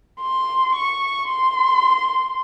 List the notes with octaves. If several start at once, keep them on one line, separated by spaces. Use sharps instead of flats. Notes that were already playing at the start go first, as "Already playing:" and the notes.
C6
C#6
C6